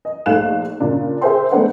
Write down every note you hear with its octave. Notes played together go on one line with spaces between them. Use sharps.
D#5
A#1 A3 D#4 F5 F#6 E7
A#2 C#3 D4
G#4 A#4 C5 E5 G5 C6
G#3 A3 B3 D4 C5 F#5